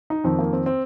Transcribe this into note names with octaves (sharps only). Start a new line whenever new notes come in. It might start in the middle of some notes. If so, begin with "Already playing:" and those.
D#4
F2 D#3 C4
A#3
C4
C4